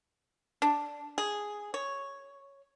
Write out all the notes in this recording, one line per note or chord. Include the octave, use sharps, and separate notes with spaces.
D4
G#4
C#5